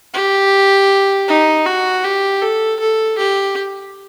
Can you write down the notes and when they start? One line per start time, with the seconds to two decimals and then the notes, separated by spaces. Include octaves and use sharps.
0.14 G4
1.28 D#4
1.66 F#4
2.04 G4
2.42 A4
2.80 A4
3.18 G4